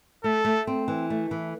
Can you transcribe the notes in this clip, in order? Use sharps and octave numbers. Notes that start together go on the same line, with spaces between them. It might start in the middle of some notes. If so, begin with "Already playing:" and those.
A3 A4
A3
C4
E3
A3
E3